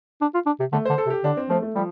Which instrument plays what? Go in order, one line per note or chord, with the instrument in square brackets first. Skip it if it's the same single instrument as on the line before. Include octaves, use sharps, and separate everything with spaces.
[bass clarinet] D4
F4
D4
C3
[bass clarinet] D3 [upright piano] A3
[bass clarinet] D3 [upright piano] C5
[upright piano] A4
[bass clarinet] C3
[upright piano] G4
[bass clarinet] D3 [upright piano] D4
[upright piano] C4
[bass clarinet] F3 [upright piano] A3
[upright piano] A3
[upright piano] F3 [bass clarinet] G3